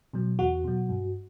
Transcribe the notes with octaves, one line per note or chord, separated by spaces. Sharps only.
B2 F#3
E2 F#4
B2 F#3
G2